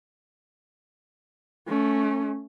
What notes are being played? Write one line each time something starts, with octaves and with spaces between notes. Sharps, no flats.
A3 C#4